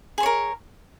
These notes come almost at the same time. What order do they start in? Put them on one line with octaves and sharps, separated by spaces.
G#4 C5 C#5 A#4